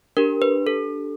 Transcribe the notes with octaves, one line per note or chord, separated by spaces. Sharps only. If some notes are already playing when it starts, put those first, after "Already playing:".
D4 G4 A#4
B4
A4